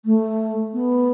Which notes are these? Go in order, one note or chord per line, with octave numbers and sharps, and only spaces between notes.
A3
B3